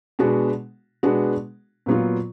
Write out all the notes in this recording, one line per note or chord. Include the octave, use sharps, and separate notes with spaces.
B2 G#3 B3 D4 F#4
B2 G#3 B3 D4 F#4
A#2 F#3 B3 F4